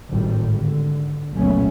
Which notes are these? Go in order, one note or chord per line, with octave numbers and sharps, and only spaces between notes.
G#1 A2 C3 G3
D3
F#1 C#2 B2 A3 B3 C#4